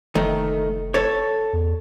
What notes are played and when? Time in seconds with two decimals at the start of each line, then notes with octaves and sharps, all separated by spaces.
0.15 F1 D#3 A3
0.94 A4 C#5
1.53 E2